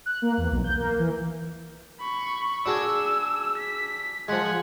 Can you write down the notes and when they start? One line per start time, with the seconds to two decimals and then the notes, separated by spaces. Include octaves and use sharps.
0.06 F#6
0.22 A#3
0.38 E2
0.52 B1
0.64 G6
0.76 A#3
0.99 E3
2.00 B5 C#6
2.66 D4 F#4 G#4 E6
3.58 B6
4.28 F3 G#3 F#5 G#5